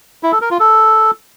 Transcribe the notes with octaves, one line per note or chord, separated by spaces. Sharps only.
E4
A4
A#4
F4
A4